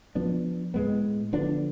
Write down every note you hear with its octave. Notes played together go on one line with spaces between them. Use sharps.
F3 B3 D4
A2 G#3 B3
D3 F3 B3 D4